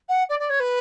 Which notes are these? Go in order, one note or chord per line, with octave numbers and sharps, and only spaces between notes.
F#5
D5
D5
C#5
B4